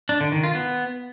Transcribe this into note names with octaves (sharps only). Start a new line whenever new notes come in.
D4
D3
D#3
F4
B3